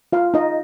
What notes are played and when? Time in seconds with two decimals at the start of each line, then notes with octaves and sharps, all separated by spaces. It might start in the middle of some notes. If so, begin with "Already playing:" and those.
0.13 F4 F5
0.34 D#4 D#5